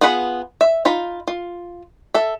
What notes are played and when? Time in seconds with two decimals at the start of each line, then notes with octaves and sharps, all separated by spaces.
0.01 B3 F4 G#4 F#5 B5
0.61 E5
0.85 D#4 F4 B5
1.28 F4
2.14 A4 E5